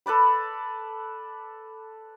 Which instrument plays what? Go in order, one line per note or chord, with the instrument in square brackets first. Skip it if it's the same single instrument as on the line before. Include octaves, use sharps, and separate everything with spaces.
[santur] A4 B4 D5 B5